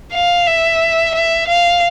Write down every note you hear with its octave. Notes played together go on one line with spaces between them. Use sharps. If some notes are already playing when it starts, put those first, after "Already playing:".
F5
E5
E5
F5